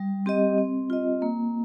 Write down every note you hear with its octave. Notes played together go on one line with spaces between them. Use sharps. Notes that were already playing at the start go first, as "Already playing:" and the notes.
Already playing: G3
C4 G4 D#5
C4
F4 D#5
A#3